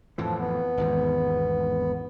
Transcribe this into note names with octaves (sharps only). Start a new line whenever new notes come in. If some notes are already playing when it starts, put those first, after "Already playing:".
F2 A2 E3 F3
B3
G#1 E2 G#2